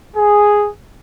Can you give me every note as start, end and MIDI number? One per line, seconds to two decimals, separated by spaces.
0.17 0.68 68